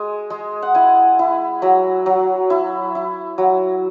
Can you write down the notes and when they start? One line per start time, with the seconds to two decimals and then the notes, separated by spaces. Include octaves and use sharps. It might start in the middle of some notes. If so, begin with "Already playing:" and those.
Already playing: G#3 G#5
0.30 G#3
0.62 F#5
0.75 E4 G#5
1.19 E4
1.62 F#3 B5
2.06 F#3
2.50 E4
2.95 E4
3.38 F#3